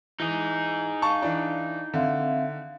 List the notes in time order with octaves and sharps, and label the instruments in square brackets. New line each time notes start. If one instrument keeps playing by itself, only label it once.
[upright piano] E3 [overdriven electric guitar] D#4 G#4
[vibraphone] F5 [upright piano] A5 C#6
[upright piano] E3 D4
[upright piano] D3 [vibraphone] C4 E5 F5